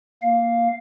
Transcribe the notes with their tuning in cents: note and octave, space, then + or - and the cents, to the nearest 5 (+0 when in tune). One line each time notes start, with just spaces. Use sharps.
A#3 +5 F5 +0